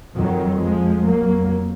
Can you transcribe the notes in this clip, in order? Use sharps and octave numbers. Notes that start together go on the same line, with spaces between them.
F2 D#3 F#3
F3 G#3
F2 F#3 A#3